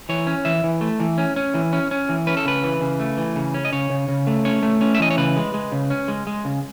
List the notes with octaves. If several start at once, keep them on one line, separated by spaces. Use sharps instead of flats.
E3 C#5
C#4
E3 E5
E3
A3
E3
C#4
C#4
E3
C#4
C#4
E3
C#4 B4
A4
C#3 B4
E3
C#3
A3
E3
C#3
C#4
D#5
C#3 C#5
C#3
C#3
A3
C#4 C#5
A3
C#4
E5
E3 D#5
C#5
C#3 B4
G#3
G#3
C#3
C#4
G#3
G#3
C#3